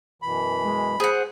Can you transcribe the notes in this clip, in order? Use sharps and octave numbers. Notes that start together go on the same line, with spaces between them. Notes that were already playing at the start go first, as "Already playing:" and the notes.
F#2 B2 E3 B5
G#3
G#4 C5 F#5